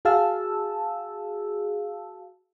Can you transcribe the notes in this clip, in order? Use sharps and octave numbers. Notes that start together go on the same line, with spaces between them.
F#4 G#4 F5 A5 E6